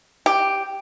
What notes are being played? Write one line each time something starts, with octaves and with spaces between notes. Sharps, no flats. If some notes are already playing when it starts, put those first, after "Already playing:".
G4